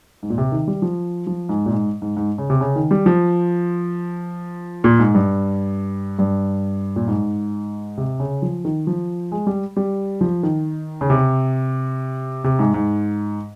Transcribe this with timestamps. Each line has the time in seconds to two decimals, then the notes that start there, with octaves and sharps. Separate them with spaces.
0.23 G#2
0.30 A#2
0.38 C3
0.52 D#3
0.67 G3
0.82 F3
1.27 F3
1.49 G#2
1.66 A#2
1.72 G#2
2.02 G#2
2.17 G#2
2.38 C#3
2.50 C3
2.61 C#3
2.76 D#3
2.91 G3
3.06 F3
4.84 A#2
4.99 G#2
5.15 G2
6.19 G2
6.96 A#2
7.08 G#2
7.98 C3
8.20 C#3
8.42 F3
8.65 D#3
8.87 F3
9.32 G#3
9.47 G3
9.77 G3
10.21 F3
10.43 D#3
11.01 C#3
11.10 C3
12.44 C3
12.59 G#2
12.74 G#2